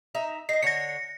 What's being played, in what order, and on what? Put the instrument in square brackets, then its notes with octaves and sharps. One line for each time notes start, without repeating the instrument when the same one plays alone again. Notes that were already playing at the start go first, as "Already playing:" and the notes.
[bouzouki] D#4 E5 A#5
[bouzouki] D#4 D#5 [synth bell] C7
[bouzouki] D3 C#5 [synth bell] A#6 C#7